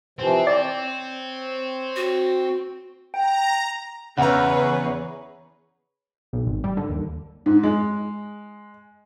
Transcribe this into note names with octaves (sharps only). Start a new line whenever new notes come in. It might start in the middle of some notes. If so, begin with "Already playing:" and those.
C3 E3 F3 C4
C#5 D5
F#4
G5 A#5
E2 C#3 G#4 B4 C#5 F#5 A#5
B1
G#1
G3
D3
D#2
G#2
G#3